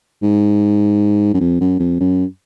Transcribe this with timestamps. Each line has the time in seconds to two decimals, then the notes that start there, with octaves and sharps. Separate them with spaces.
0.22 G#2
1.34 F#2
1.40 F2
1.60 F#2
1.79 F2
2.00 F#2